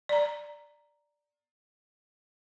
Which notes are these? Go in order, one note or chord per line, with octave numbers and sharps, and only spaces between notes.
D5 A#5